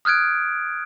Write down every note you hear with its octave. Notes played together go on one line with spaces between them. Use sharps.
D#6 F6 F#6 G#6 D7